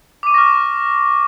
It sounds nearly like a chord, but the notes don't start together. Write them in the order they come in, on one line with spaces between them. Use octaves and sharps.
D6 D#7 C#6 A#6 F6